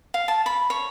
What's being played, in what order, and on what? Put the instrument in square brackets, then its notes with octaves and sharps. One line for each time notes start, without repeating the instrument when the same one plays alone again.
[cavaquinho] F5
A5
B5
C#5